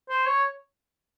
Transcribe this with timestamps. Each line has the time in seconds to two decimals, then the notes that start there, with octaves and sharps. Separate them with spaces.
0.09 C5
0.26 C#5